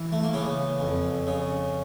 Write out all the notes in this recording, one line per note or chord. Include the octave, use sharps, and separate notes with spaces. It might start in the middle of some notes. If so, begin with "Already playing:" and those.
Already playing: E3
A3
A#3
C#3 B3
F2
C#3